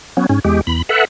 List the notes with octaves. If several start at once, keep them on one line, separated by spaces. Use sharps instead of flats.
F#3 B3 C#4
G#2 C#4
E2 G#3 G4
E2 B5
A4 B4 E5 F#5